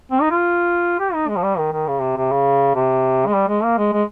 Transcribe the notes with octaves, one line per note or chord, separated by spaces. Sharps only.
C4
D#4
F4
G4
D#4
G#3
F3
G3
D#3
D#3
C#3
C3
C3
C#3
C3
G#3
G3
G#3
A#3
G#3
G#3